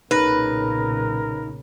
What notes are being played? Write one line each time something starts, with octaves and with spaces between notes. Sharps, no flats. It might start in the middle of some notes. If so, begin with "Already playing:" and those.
B1 A#2 C#3 D#4 A#4 B4 B5 A#6